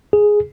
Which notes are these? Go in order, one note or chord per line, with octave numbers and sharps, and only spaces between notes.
G#4